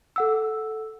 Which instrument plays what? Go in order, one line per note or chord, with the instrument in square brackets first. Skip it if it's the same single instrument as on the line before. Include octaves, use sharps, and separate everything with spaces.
[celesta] A4 F#5 E6